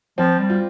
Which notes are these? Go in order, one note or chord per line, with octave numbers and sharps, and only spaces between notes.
F3 C4
G3
F4